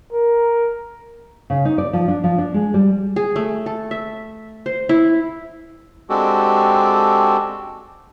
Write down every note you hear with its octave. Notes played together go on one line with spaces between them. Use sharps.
A#4
C#3
D#4
D5
F3
D4
F3
D4
G#3
G3
G#4
A3
A4
E5
C5
E4
G#3 C4 D4 F#4 G4 A4